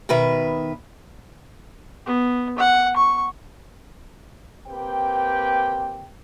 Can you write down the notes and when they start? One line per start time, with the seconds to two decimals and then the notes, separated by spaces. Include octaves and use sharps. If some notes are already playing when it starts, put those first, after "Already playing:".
0.09 B2 D#3 B4 E5
2.06 B3
2.58 F#5
2.96 C#6
4.67 A#3 C4 G4 B4 G5